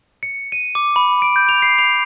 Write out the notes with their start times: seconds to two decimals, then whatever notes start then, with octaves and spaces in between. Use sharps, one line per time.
0.23 C#7
0.52 D#7
0.75 D6
0.96 B5
1.22 D7
1.36 G6
1.49 F7
1.62 C7
1.78 F7